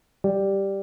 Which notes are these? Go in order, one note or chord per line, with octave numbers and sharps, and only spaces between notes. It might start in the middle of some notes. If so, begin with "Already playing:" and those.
G3